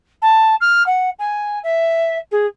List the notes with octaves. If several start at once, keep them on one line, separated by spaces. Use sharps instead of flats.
A5
F6
F#5
G#5
E5
G#4